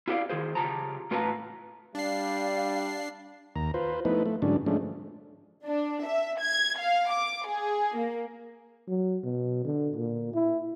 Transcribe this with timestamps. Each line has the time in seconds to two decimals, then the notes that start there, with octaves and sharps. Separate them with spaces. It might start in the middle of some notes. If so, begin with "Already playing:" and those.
0.08 E4 F4 G4 C5 D5 F5
0.29 D#3 F4 G#4 C5
0.55 C#3 F4 G4 G#4 A5 A#5
1.11 A2 F4 B4 F5 A5 A#5
1.95 G3 D4 F5 C7
3.56 D#2 A#5
3.74 F4 B4 C5
4.05 F3 A3 B3 D#4 E4 B4
4.26 A3
4.42 G#2 D3 F#3 C#4 D4
4.66 F3 G#3 A3 C#4 D4
5.65 D4
6.04 E5
6.39 G#6
6.77 F5
7.11 D6
7.46 G#4
7.96 A#3
8.88 F#3
9.23 B2
9.65 D3
9.95 A#2
10.34 E4